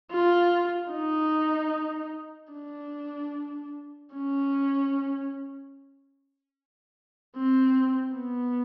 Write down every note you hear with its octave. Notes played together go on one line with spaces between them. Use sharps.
F4
D#4
D4
C#4
C4
B3